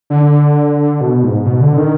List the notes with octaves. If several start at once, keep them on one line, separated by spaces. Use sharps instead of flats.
D3
B2
G#2
B2
D3
D#3